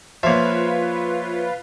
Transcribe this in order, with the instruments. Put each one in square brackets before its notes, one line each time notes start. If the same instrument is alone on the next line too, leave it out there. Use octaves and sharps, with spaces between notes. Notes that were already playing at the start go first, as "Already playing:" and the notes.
[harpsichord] F3 A#3 [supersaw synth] F4 B4 [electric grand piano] C#5 E5